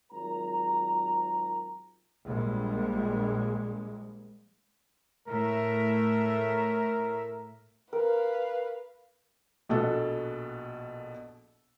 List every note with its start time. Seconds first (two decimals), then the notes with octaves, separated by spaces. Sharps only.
0.12 G#1 F#3 F4 A#4 A#5
2.26 A#1 G3 G#3
5.28 A2 A#4 E5
7.93 A#4 B4 F5
9.69 A#1 B2 F#4 A4